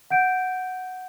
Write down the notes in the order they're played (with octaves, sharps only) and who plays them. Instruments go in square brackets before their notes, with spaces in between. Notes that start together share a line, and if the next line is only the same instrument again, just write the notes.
[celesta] F#5 G6 D7